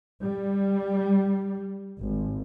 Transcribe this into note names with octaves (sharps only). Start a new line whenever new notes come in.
G3
G#1